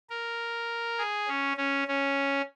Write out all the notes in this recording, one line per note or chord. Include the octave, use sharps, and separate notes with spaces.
A#4
G#4
C#4
C#4
C#4